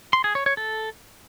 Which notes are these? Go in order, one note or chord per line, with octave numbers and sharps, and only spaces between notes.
C6
G#4
C#5
C#5
A4